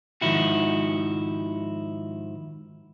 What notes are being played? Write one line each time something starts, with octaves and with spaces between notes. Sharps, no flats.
G#2 D#3 F3 E4 F#4